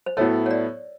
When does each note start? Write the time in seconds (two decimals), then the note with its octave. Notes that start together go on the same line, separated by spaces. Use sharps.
0.06 C5
0.17 A2 F#3 B3 E4 A4 C#5
0.46 C#5
0.51 D5